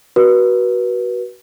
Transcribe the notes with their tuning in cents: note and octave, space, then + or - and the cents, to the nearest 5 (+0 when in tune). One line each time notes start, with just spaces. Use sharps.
F#4 +20 B4 -30